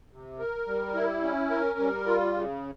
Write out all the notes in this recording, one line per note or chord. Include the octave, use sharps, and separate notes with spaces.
C3
A#4
G3
E4
C#4
A#4
G3
F4
C#3